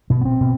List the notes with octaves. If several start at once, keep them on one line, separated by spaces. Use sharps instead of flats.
B2 B3
B3
C4
B2